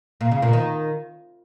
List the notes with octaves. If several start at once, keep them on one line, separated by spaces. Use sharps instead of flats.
A#2
C#3
A#2
D#3